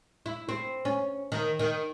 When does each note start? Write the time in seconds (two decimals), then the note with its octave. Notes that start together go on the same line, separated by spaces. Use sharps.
0.26 E4
0.49 C4
0.85 C#4
1.32 D#3
1.59 D#3